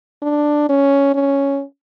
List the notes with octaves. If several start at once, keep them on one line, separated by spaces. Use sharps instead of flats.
D4
C#4
C#4